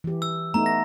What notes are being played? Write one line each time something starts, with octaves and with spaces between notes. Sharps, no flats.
E3 G4
E6
A3 B3 D#4 A#5
A#6